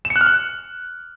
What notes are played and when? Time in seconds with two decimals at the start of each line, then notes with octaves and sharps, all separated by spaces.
0.05 E7
0.10 C#7
0.16 F#6
0.21 F6
0.26 F#6